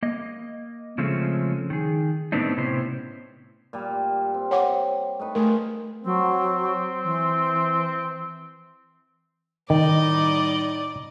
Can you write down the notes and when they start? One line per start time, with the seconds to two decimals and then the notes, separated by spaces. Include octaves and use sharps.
0.03 A#3 D#5
0.98 C#3 F3 G#3 A3 C4 C#4
1.70 D#3 G#4
2.32 A2 D3 B3 C4 D4 D#4
2.56 A2 C3 B3 C#4 E4 C5
3.73 A#2 G3
4.34 C4
4.51 C#5 F#5 D6
5.19 A3 D#4 B4
5.35 A3 F4 G#4 A#4
6.04 F#3 C4
7.03 E3
9.70 A2 D#3 G3 D#4 D5 D#5 D6